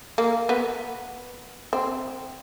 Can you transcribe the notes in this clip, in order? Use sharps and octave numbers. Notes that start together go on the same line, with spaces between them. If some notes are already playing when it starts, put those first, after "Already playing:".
A#3
B3
C4